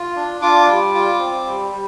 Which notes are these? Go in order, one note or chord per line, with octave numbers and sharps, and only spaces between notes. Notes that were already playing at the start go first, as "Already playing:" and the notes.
Already playing: F4
D4
F4 D6
G3
F4
C4
G3
G3